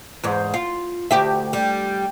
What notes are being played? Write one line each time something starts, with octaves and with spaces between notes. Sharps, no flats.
E2 G#2
F4
D2 G4 E5
G3